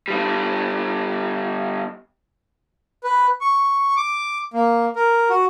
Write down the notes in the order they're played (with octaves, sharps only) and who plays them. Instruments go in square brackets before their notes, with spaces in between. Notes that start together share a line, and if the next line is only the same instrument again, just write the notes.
[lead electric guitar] G3 B3
[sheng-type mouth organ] B4
C#6
D6
A#3
A#4
F#4